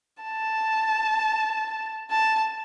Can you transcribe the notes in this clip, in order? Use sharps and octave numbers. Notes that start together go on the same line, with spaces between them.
A5
A5